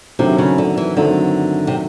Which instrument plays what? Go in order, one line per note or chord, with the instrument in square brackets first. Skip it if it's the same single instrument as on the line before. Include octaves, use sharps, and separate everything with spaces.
[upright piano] G2 D#3 F#3 A3 C4 [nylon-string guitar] C3
[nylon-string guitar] C#3
D3
E3
[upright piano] G2 D#3 F#3 A3 C4 [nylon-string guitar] D3
[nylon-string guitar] C3